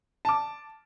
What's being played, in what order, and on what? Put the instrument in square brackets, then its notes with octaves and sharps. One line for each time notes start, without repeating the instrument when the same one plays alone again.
[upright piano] A5 D6